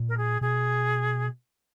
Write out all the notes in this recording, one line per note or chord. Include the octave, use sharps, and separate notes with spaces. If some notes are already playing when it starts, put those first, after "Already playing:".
Already playing: A#2
A#4
G#4
B2 G#4